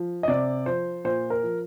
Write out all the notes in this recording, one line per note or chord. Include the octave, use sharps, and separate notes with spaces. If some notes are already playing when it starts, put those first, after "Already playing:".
Already playing: F3
D#5
C3 D5
F3 C5
A#2 C5
A#4
F3